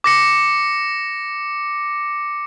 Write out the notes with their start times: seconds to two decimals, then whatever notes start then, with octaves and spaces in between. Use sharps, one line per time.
0.04 D6 A#6 C#7